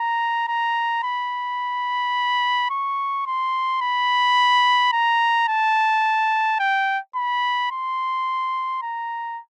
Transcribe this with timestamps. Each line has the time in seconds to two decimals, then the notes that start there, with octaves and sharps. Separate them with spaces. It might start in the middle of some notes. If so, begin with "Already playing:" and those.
Already playing: A#5
0.48 A#5
1.04 B5
2.70 C#6
3.26 C6
3.82 B5
4.93 A#5
5.48 A5
6.60 G5
7.16 B5
7.71 C6
8.82 A#5